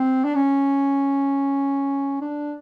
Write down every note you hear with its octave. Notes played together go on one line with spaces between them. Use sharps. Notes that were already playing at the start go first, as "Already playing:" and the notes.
Already playing: C4
D4
C#4
D4